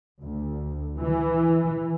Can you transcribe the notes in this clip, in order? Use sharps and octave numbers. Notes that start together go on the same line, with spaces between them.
D2
E3